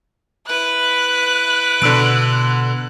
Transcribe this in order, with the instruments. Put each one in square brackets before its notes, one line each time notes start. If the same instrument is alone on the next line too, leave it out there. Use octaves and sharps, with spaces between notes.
[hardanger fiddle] E4 B4 [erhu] F#6
[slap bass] B2 [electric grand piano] D3 E6 D7